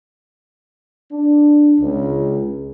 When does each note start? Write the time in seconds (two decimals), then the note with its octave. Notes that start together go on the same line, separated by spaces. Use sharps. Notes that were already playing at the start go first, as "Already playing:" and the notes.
1.12 D4
1.81 C#2